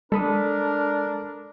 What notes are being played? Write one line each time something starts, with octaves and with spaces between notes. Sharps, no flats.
G#3 D4 A4 A#4 B5 D#6